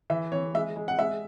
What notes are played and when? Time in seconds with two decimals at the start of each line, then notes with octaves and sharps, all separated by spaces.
0.10 E3 E5
0.32 E3 C#5
0.55 G#3 E5
0.76 G#3
0.88 F#5
0.99 G#3 E5